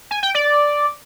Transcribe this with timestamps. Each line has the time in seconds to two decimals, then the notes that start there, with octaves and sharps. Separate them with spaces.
0.11 G#5
0.23 G5
0.35 D5